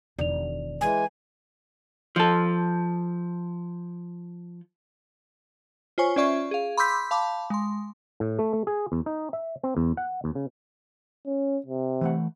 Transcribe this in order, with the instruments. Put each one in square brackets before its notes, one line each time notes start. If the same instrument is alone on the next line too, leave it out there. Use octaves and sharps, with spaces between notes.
[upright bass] E1 D#3 [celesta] D5 F7
[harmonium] E3 G#3 [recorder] G#5
[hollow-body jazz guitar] F3 A4
[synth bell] F4 C5 C#5 G#5 C#6
C#4 F4 D5 E5 C#6
G#4 F5
B5 C6 D6 E6 G6 B6
F5 A5 B5 D6
G#3 C6
[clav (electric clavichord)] A2
A3
A3
G#4
E2
D#4
E5
C4
E2
F#5
D#2
C#3
[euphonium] C#4
C3
[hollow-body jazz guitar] E3 A3 F#5